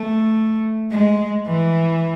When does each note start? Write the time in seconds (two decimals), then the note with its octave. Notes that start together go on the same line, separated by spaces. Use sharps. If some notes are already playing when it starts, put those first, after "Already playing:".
Already playing: A3
0.90 G#3
1.46 E3